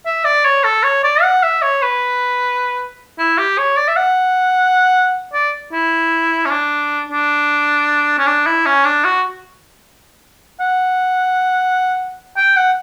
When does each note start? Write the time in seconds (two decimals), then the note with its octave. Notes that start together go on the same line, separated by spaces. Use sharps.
0.06 E5
0.24 D5
0.45 C#5
0.64 A4
0.83 C#5
1.03 D5
1.22 F#5
1.43 E5
1.62 C#5
1.82 B4
3.18 E4
3.38 G4
3.58 C#5
3.77 D5
3.88 E5
3.96 F#5
5.33 D5
5.72 E4
6.45 C#4
6.50 D4
7.09 D4
8.18 C#4
8.26 D4
8.46 E4
8.66 C#4
8.85 D4
9.04 F#4
10.60 F#5
12.37 G5
12.56 F#5